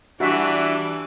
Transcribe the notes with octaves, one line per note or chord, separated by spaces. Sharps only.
E3 G3 D4 F#4 E5